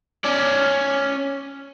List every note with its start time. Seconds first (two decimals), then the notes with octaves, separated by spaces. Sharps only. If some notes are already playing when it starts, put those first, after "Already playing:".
0.25 C#4 D5